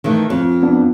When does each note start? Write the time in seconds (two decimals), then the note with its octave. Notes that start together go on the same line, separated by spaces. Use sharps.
0.04 D#3 E3 A3
0.30 F2
0.63 B3 D4